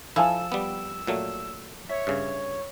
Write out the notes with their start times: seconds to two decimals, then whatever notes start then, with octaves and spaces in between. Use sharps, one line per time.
0.16 F3 E4 A4 G#5 A5 E6
0.52 G3 B3 G4
1.07 A#2 F#3 A3
1.89 C#5 E5
2.07 G2 C#3